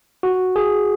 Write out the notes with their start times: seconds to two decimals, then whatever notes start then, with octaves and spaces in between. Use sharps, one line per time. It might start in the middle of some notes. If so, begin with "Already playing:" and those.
0.23 F#4
0.56 G#4